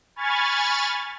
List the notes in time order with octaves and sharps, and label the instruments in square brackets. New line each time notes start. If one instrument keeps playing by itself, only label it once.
[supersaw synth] G#5 B5 C#6 F6 G#6 A6